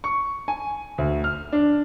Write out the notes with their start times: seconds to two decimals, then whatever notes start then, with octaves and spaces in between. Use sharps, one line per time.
0.04 C#6
0.48 G#5
0.98 D2
1.24 F6
1.53 D4